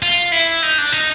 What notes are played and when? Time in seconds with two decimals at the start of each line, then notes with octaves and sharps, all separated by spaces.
0.03 F4
0.32 E4
0.63 D#4
0.78 D4
0.92 D#4